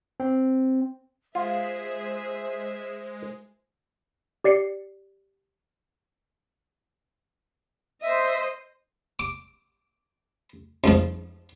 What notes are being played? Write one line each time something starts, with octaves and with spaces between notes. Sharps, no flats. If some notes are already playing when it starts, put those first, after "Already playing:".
C4
G#3 F4 G#4 C5 E5
G4 D5 C7 C#7
C5 D#5 E5
D6
F2 G#2 F3